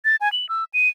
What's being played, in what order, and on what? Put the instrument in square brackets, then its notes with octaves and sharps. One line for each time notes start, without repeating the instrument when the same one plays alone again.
[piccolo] A6
G#5
F#7
E6
D#7